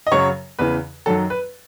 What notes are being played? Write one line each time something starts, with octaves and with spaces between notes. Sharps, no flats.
D#5
F#2 C#3 F#3 C#5
E2 C#3 E3 B4
F#2 D#3 F#3 A4
B4